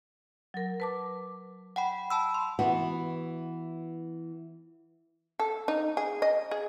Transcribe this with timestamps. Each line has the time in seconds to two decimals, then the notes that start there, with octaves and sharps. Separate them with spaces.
0.54 F#3 A#4
0.80 B4 A5 D6
1.76 F#5 G5 B5
2.10 A5 B5 E6
2.34 C6
2.59 E3 B3 F#4
5.39 A4
5.68 D#4
5.97 G#4
6.22 D#5
6.51 G#4